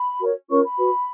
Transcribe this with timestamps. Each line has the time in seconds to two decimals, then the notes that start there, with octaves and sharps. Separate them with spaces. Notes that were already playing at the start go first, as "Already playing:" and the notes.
Already playing: B5
0.20 F#4 A#4 C#5
0.49 C#4 F4 A#4 C#5 C#6
0.63 B5
0.78 F#4 B4